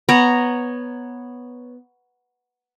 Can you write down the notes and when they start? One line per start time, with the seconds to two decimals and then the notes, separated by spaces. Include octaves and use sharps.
0.09 B3 C#5 A#5